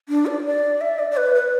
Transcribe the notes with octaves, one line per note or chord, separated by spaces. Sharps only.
D4
D5
D5
E5
D5
D5
B4
B4